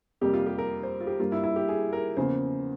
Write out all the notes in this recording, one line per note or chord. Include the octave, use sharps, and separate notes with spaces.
F2 C3 G3 A#3 G4
F4
G4
A#4
C5
F4
G4
G2 G3 A#3 F4
E4
E4
G4
G#4
A#4
E2 C#3 F3 A#3 C5